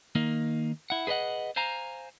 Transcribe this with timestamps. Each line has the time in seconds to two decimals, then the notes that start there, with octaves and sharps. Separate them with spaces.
0.15 D#3 A#3 D#4
0.90 E4 F#5
1.07 G#4 B4 C#5 D#5 F#5
1.56 C5 F5 G#5 A#5